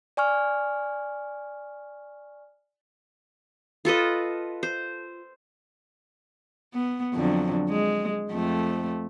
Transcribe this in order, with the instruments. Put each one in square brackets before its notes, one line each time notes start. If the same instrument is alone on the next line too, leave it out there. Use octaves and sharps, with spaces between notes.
[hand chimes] D5 G#5 C#6 F6
[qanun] F4 A4 B4 D#5
C5
[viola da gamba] B3
F2 D3 F#3
G#3
F2 A3